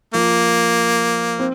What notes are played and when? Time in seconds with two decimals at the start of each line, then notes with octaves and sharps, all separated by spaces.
0.14 F3 A#3
1.39 C4